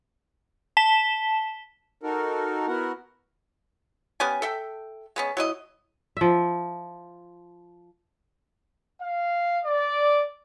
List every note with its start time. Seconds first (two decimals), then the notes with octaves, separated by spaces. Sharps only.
0.77 A5 B6 E7 G7
2.01 D#4 F#4 A4 A#4
2.67 B3 E4 F#4 A#4 F#5
4.20 B3 C#4 G4 G#5
4.42 A4 E5 G5
5.16 G#3 B3 C#4
5.37 F#3 E4 D#5
6.17 F3 E5
9.01 F5
9.64 D5